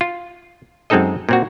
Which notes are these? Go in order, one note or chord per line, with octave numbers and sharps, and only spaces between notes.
F4
F#2 G#3 C4 D#4 A4 D#5
A#2 C4 F#4